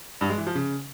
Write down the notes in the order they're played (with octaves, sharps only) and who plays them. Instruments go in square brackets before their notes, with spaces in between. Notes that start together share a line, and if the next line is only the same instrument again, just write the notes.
[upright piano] G2
G#3
E3
F3
C#3